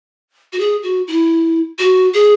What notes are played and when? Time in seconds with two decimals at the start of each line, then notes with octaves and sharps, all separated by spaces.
0.53 F#4
0.59 G#4
0.83 F#4
1.08 E4
1.79 F#4
2.14 G#4